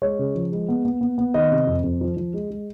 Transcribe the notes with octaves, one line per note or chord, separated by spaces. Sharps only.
G#3 C#5
C#3
F3
G#3
B3
B3
B3
B3
D#3 D#5
C3
F2
F2
F3
F3
G#3
G#3